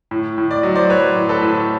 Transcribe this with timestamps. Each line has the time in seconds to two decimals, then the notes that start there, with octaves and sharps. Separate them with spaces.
0.11 A2
0.38 A2
0.51 D5
0.63 F#3 D#5
0.75 C5 D5
0.90 F#3 B4 C#5
1.16 A2
1.29 A4 B4
1.42 A2